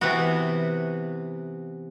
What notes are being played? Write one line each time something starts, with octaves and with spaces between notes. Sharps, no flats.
C3 E3 B3 F#4